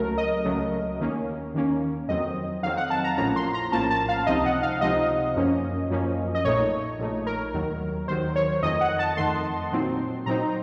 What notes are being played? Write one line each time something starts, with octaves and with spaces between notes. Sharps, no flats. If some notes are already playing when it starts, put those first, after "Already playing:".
Already playing: C#2 C#3 F#3 A3 A#4
D#5
C#2 C#3 F#3 A3
D#2 D#3 A#3 C#4
D#2 D#3 A#3 C#4
F2 D#3 F#3 C4 D#5
F2 D#3 F#3 C4 F5
F#5
A5
A#5
A#1 A2 F3 A#3 C#4 A#5
C6
A#5
A#1 A2 F3 A#3 C#4 A5
A5
F5
C#2 C3 F3 C4 D#4 D#5
F#5
F5
C#2 C3 F3 C4 D#4 D#5
F#2 F3 A#3 C#4
F#2 F3 A#3 C#4
D#5
A#1 A#2 A3 D#4 C#5
A#1 A#2 A3 D#4
A#4
D#2 D#3 F#3
D#2 D#3 F#3 C5
C#5
F2 D#3 A3 D#5
F#5
A5
F2 D#3 A3 C6
A#2 F#3 C4 D#4
A#2 F#3 C4 D#4 A#5